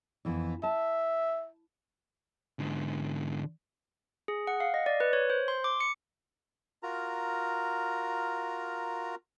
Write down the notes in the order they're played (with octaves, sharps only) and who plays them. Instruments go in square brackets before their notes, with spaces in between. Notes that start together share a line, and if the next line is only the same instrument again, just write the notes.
[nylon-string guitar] F2 E3 B3
[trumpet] E5 [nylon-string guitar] A5
[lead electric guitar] G#2 D3
[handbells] G#4
F#5
F5
D#5
D5
B4
C#5
C5
C6
D6
C#7
[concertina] F4 F#4 A#4 A#5